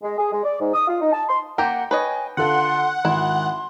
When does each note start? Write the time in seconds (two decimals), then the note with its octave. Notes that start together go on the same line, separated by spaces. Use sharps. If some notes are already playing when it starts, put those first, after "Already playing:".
0.02 G#3
0.18 G#4
0.31 G#3
0.44 D5
0.59 G#2
0.74 D#6
0.88 F4
1.01 D#4
1.13 A5
1.28 C6
1.58 A#3 G4 A#4 F#5 G5
1.91 B4 C#5 D#5 G#5
2.37 D3 F4 A4 F#5 C6
3.05 G#1 E4 C6